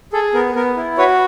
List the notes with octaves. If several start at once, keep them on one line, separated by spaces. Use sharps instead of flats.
G#4 A4
B3 A#4
B3 A#4
E4
F#4 B4 C#5